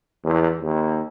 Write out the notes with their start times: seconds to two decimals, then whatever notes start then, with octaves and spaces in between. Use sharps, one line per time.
0.24 E2
0.61 D#2